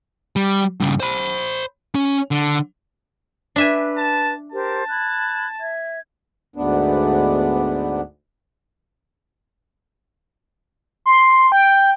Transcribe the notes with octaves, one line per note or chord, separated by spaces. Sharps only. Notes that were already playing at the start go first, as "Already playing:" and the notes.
G3
G2 C#3
C5 B5
C#4 C#5
D3
D4 B4 E5 G#5
A5
G4 A#4 C5 A5
B5 F#6 G#6
E5 G#6
D2 G#2 B3 D4
C6
G5